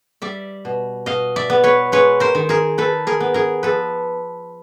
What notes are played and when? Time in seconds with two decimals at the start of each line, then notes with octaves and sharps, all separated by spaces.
0.22 G3 D5 E5
0.65 B2
1.06 B2 D#5 F5
1.36 D5 E5
1.50 B3
1.64 B4 C#5
1.92 G#3 B4 C#5
2.20 A#4 C5
2.35 D#3
2.49 G#4 A#4
2.78 D#3 A4 B4
3.07 G#4 A#4
3.20 B3
3.34 G#4 A#4
3.63 F3 A4 B4